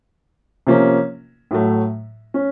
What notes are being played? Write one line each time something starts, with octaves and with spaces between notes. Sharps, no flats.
C3 F3 A#3 C#4
A2 F#3 A3
C#4